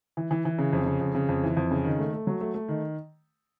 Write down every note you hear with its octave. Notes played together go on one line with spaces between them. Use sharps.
E3
E3
E3
C#3
F2
C#3
F2
C#3
F2
E3
F2
C#3
D#3
A3
A3
F#3
A3
A3
D#3